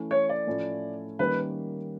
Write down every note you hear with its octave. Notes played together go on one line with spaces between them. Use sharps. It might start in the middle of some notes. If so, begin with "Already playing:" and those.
Already playing: E3 A3 C#4
C#5
D5
A2 F3 A3 C#4 E4
D#3 G3 A#3 C#4 B4